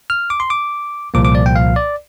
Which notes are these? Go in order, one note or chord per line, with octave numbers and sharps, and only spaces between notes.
F6
D6
C6
D6
C2 A#2 F3 A#3 D6
D6
D5
G5
F5
D5